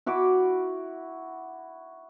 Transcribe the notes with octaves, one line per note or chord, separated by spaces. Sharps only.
E4 F#4 B5 D6